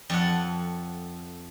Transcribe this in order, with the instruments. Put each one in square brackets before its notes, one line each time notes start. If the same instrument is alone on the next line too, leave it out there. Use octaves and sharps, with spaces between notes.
[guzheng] F2 A4 F#5